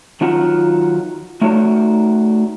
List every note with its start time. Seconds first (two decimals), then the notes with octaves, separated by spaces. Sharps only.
0.21 D#3 F#3 D#4 F4 F#5 A5
1.42 A3 D#4 F#4 C#5 D5 A5